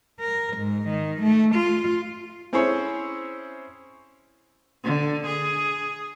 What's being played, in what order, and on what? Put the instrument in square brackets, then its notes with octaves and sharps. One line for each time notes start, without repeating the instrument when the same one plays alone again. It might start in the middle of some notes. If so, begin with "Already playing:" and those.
[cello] A#4
G#2
D#3
A3
F4
[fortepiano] C4 C#4 E4 G#4 C5 C#5
[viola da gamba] D3
G#4